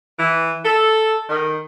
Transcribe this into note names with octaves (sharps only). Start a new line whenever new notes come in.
E3
A4
D#3